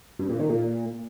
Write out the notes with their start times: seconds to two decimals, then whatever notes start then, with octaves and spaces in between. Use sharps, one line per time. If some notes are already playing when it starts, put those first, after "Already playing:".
0.19 G2
0.29 A#2
0.40 D#3
0.50 A#2